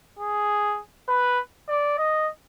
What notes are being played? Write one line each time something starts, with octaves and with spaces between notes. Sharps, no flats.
G#4
B4
D5
D#5